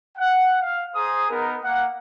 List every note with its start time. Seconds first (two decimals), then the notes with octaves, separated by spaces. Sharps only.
0.16 F#5
0.61 F5
0.94 G#4 C5 A#5 D#6
1.30 B3 D#4 A#4
1.64 A#3 F#5